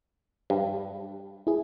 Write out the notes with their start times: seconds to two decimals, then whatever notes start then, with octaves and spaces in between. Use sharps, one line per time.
0.50 G2
1.47 E4 G#4